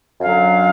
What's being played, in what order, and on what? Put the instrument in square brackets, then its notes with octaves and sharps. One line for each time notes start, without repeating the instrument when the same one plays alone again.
[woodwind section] F#2 D3 F#3 F5